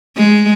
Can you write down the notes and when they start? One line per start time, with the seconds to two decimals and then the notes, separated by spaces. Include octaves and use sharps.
0.17 G#3